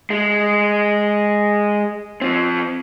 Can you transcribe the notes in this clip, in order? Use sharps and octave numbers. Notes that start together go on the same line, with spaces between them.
G#3
F3 C4